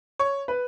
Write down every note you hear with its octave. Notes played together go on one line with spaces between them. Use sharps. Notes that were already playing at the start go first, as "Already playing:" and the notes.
C#5
B4